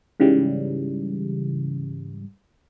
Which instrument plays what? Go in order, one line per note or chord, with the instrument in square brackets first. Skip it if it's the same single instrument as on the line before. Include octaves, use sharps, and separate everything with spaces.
[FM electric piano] G#2 C#3 E3 G3